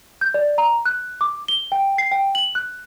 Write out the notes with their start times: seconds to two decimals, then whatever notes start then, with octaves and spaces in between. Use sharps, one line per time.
0.21 G6
0.34 D5
0.58 A#5
0.86 F#6
1.21 D6
1.48 G7
1.72 G5
1.98 C7
2.11 G5
2.35 F#7
2.55 F#6